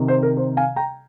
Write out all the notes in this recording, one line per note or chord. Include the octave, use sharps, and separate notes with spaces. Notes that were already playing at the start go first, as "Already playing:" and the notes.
Already playing: C3 D#3
C5
A#4
C5
F5 G#5
G5 A#5